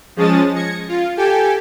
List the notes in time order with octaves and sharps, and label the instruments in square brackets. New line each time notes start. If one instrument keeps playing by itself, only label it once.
[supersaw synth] F3 G#3 C#4 A5 D#6 A6
G#6 A#6 C#7
F4
G4 A4 G5 G#5